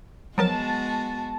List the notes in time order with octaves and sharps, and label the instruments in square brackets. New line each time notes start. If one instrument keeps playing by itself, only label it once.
[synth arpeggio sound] F3 F#3 A#4 [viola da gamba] G#3 B3 F#4 [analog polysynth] A5